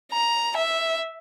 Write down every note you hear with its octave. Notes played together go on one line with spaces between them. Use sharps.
A#5
E5